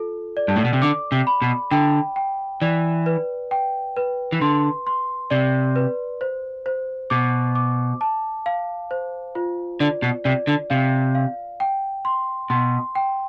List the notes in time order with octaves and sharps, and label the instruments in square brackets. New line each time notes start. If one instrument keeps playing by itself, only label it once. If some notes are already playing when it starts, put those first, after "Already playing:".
Already playing: [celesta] F4 A4
D5
[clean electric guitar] G2
A2
B2
C3
[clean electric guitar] D3 [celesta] D6
[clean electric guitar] C3
[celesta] B5
[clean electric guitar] B2
[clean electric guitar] D3 [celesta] G5
[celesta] G5
[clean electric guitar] E3 [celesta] D5
[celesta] B4
G5
B4
[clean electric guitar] E3
[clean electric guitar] D3 [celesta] C6
[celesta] C6
[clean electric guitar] C3 [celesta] D5
[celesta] B4
C5
C5
[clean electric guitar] B2 [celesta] D6
[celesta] D6
A5
F5
C5
F4
[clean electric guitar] D3 [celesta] D5
[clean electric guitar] B2
[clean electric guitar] C3 [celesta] D5
[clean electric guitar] D3
[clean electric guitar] C3 [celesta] F5
[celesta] F5
G5
C6
[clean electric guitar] B2 [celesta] C6
[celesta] G5